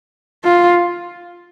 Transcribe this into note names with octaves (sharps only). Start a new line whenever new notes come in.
F4